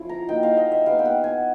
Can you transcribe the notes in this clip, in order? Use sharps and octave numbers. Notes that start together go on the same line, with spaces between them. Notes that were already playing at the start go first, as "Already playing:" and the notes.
Already playing: F3 C#4 E4
A#5
F#3 A#3 D#4 G5
F5
D#5
E5
G3 B3 D#4 F5
G5
F#5
G#5